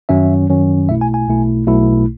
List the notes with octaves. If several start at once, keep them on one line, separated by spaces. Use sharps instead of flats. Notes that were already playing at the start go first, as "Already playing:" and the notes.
F#2 D#3 F#3 C#4 E5
F#2 D#3 F#3 C#4
B1 B2 A3 E4 E5
G#5
G#5
B1 B2 A3 E4
B1 B2 A3 E4